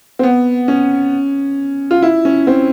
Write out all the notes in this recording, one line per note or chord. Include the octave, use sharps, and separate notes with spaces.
C4
B3
C#4
F4
E4
C#4
C4